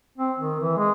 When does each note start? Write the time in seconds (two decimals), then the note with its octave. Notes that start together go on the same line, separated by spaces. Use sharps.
0.18 C4
0.39 D#3
0.60 E3
0.77 G#3